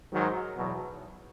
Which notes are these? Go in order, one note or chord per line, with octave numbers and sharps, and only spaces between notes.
G#2 D#3 F#3
E2 B2 F#3